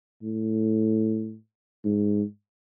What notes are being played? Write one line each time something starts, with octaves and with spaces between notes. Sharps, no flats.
A2
G#2